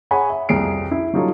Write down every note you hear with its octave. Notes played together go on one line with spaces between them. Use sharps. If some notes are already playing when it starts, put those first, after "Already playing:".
G#4 C#5 F#5 G#5 B5
E5
C2 F2 G#4 C7 D7
E4
F#3 G3 D#4 F4 A4 C#5